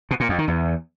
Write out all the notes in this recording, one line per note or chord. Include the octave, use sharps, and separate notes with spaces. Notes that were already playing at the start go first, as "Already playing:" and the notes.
B2
A#2
F2
D#3
E2